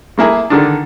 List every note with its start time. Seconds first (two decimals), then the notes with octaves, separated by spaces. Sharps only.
0.18 A3 A#3 E4 G#4
0.50 D3 D#3 D4